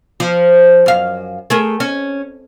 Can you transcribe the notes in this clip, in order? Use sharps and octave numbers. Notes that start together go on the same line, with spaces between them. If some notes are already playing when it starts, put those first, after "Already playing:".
F3
F#2 F5
A3 G#4 A#4
C#4